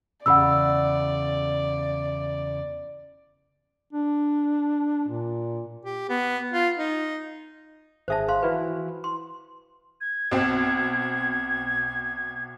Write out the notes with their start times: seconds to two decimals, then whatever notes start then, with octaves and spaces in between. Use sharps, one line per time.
0.26 E2 C#3 D5 F#5 B5 E6
3.93 D4
5.08 A#2
5.85 G4
6.09 B3
6.52 F4
6.77 D#4
8.08 G#1 G#4 C5 E5 A5 A#6
8.29 C5 F5 C6
8.42 E3 E4 F#4 B4
9.04 C6
10.01 G#6
10.31 B1 C4